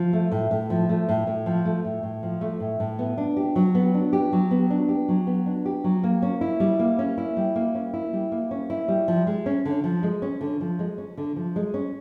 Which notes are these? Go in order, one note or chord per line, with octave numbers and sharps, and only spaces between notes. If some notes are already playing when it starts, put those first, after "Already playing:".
Already playing: F3
A3
A2
A2
F3
A3
A2
A2
F3
A3
A2
A2
F3
A3
A2
A2
B3
D4
G4
F#3
B3
D4
G4
F#3
B3
D4
G4
F#3
B3
D4
G4
F#3
A#3
C#4
E4
G3
A#3
C#4
E4
G3
A#3
C#4
E4
G3
A#3
C#4
E4
G3
F3
G#3
C#4
D3
F3
G#3
C#4
D3
F3
G#3
C#4
D3
F3
G#3
C#4